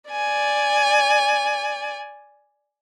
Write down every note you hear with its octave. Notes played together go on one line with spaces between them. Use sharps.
D5 G#5